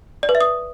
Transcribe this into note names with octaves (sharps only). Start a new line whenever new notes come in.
D5
B4
E5
D#6